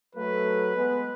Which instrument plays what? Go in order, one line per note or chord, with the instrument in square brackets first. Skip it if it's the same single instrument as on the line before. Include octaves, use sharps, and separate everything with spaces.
[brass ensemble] F#3 A3 [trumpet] B4
[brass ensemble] G#3 B3